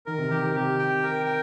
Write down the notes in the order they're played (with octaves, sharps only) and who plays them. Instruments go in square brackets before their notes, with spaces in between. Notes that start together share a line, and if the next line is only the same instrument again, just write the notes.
[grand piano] D#3 [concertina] A#4
[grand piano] C3
[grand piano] D#3 [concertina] G4
[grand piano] D#3
[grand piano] C3 [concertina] G4
[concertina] G5
A#4
G5